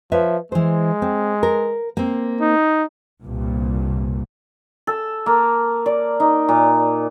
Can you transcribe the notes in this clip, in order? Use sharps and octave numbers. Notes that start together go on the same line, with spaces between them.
F3 B4 C#5 E5
E3 G#3 C5
C4
A#4
A#3 C4
D#4
C2 G2 A#2
A4
A#3
D5
D#4
A#2